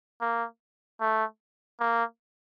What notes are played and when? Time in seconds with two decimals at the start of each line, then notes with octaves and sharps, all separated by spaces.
0.21 A#3
1.01 A3
1.80 A#3